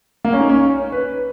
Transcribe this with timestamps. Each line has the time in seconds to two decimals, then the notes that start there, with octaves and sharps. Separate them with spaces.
0.25 A#3
0.33 C#4
0.41 D#4
0.49 C#4
0.92 B4